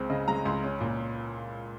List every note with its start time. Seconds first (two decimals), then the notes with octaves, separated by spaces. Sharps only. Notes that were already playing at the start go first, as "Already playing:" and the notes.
Already playing: C#2 G#3 C4
0.10 C#3 D#5
0.28 G#3 A#5
0.45 C#2 C6
0.64 C#4
0.81 A#2